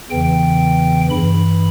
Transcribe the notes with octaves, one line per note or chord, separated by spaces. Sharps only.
E2 C#3 E3 G5
G2 E3 B5